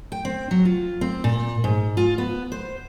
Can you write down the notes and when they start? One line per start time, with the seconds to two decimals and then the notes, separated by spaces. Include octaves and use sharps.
0.12 G5
0.25 C4
0.51 F#3
0.65 F4
1.01 C4
1.24 A#2
1.64 G#2
1.97 F4
2.18 B3
2.52 C5